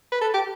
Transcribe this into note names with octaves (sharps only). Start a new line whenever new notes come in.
B4
A4
G4